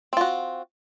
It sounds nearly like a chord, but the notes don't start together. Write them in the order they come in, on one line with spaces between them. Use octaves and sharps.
C4 F4 F#4